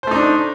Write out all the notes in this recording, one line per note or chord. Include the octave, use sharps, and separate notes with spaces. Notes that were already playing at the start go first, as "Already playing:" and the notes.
A3 D4 D#4 C5